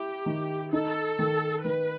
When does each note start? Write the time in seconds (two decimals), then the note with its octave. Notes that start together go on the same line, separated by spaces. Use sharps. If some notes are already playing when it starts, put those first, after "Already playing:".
Already playing: E4 G4
0.26 D#3
0.72 D#4 A4
1.19 D#3
1.65 D#3 B4